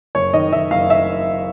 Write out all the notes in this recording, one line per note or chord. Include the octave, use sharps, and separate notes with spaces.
F#1 C#5
D#3 D#5
D#3 E5
F#1 F5
E5